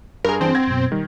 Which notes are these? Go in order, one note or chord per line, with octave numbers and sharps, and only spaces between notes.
G2 G#4 A#4
E3 C4 D4 A5
F#5 G#6 A#6
F#2 B2
D#3 G3